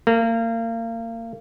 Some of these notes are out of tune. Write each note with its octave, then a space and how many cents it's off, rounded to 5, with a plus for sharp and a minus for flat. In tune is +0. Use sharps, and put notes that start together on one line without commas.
A#3 -30